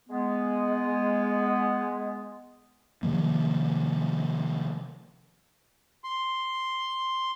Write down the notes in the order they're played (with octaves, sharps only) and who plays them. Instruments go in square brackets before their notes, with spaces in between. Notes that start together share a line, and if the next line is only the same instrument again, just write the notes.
[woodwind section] G#3 B3
[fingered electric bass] C3 D#3 F3 A#3
[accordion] C6